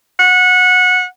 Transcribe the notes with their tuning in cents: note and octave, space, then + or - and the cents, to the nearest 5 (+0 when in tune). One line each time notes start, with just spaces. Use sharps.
F#5 -20